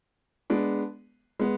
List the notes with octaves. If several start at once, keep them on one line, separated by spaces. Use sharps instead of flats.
G#3 B3 D4
G#3 B3